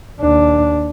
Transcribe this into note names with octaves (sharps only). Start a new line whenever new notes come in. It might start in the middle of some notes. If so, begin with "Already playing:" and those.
D#2 D4